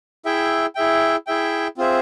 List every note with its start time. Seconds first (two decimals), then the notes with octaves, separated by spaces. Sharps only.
0.25 E4 G#4 E5 G5
0.75 E4 G#4 E5 G5
1.27 E4 G#4 E5 G5
1.77 C4 F4 G#4 C5 E5